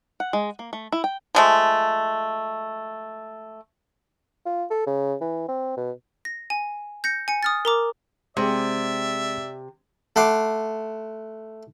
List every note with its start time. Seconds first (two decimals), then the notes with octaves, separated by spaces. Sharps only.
0.20 F#5
0.33 G#3
0.59 A#3
0.73 A3
0.92 E4
1.04 G5
1.35 F3 G#3 A3
4.46 F4
4.70 A4
4.86 C#3
5.21 E3
5.48 C4
5.77 B2
6.25 A#6
6.50 G#5
7.04 G6 A#6 C#7
7.28 G#5 C#7
7.43 D#6 F6 A6
7.65 A#4 A#5 D6
8.37 C3 G#3 C4 G#4 D5 E5
10.16 A3 F#5 C6 D6